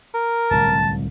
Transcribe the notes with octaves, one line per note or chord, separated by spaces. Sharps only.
A#4
D1 C2 A5